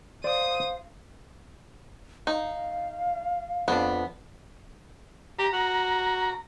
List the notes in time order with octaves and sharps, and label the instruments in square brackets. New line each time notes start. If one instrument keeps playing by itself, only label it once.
[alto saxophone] C5 [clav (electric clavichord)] D5 [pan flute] F5 [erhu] D#6
[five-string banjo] D#4 [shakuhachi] F5
[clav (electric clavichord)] F2 D4 [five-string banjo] B3
[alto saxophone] G4 [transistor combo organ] A#5
[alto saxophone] F#4